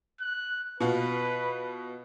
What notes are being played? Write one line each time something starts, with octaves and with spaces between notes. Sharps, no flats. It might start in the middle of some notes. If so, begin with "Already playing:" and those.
F#6
B2 F4 F#4 B4